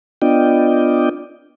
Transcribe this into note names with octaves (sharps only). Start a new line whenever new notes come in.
B3 D4 F4 D5 D#5 G5